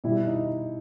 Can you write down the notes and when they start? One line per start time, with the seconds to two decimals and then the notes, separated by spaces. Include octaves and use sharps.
0.04 B2 G3 E4
0.27 D#4